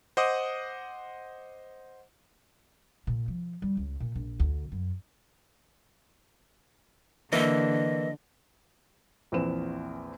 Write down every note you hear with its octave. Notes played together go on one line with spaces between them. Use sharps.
C5 D#5 F#5 D6 D#6
A#2
F3
G3
C#2
A#2
A#1
D2
F#2
D3 E3 A#3 D#5
A#1 E2 C4 B4 E7